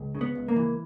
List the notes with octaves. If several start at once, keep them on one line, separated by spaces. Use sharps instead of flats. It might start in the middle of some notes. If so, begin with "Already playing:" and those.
Already playing: C#2
C#3
B3
C#2
A#3
E3